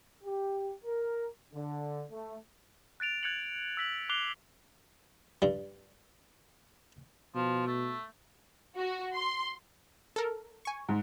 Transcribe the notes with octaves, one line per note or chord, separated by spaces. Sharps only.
G4
A#4
D3
A3
F#6 A6 D7 F7
F#6 G#6 A6 C#7 F7 F#7
E6 B6 F#7
D6 F#6 C7 F7 G7
G2 G3
B2 F3
A3
F#4
C6
A4 A#4
G#5 C#6
G#2